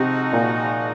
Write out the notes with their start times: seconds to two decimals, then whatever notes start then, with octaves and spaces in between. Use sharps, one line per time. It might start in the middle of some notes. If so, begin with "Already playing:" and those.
Already playing: C3 F3 G#3 D#4 F#4
0.33 A#2